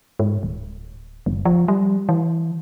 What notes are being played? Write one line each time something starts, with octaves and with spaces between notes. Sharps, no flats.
G#2
D1
F#1
F3
G3
E3